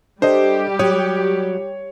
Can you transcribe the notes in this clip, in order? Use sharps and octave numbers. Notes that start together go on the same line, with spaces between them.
G3 D4 G4 A4 C5 D#5
F#3 C#5 D#6